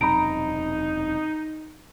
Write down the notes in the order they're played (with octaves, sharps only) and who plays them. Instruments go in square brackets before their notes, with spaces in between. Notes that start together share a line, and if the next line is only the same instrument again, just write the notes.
[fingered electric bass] E1 F#2 C3 [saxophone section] D#4 [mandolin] A#5 [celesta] B5 D7